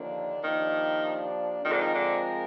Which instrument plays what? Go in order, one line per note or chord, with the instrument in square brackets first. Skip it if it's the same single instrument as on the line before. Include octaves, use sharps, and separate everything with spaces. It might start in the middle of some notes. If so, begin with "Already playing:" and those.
Already playing: [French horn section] D#2 D3 F3 A#3 D4
[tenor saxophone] D#3 [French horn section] F3 A#3 D4 G4
[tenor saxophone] D#3 [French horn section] F3 G#3 C4 F4 A#4
[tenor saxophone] D3
D#3
D3